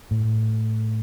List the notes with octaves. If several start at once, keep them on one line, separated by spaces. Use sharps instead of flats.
A2